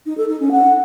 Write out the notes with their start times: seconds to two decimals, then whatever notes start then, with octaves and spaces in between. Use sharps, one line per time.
0.06 D#4
0.17 A4
0.29 D#4
0.40 C#4
0.51 F#5